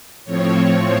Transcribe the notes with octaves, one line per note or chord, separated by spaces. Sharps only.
A2 F3 C4 C#5